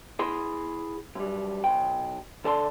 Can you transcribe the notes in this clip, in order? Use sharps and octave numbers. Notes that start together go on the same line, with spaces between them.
E4 G#4 C6
F#2 G3
B1 G5
D2 A4 D5 A5 C6